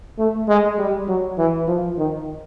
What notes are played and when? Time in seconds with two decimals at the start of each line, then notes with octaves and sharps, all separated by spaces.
0.19 A3
0.48 G#3
0.79 G3
1.08 F#3
1.38 E3
1.68 F3
1.98 D#3